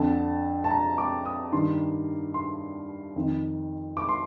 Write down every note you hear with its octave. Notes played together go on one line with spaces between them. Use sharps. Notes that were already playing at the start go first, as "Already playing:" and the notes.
Already playing: F2 D3 A5
A5
A#5
D6
D#6
G2 D#3 C6
C6
F2 D#3
D6
C6